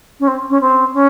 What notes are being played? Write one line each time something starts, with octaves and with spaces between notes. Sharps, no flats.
C#4
C4
C#4
C4
C#4